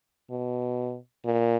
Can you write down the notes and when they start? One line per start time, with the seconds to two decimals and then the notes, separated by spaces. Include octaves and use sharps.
0.31 B2
1.25 A#2